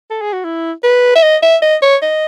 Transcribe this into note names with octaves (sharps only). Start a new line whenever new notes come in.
A4
G#4
F#4
E4
B4
E5
D#5
E5
D#5
C#5
D#5